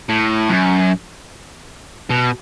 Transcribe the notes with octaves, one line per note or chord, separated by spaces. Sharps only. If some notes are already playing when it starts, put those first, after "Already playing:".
A2
F#2
B2